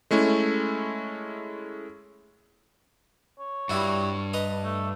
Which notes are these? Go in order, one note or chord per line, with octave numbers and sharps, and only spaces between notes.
G#3 A3 C#4 E4
C#5
G2 G3 E4 F#4
B4 D#5 A#5
A3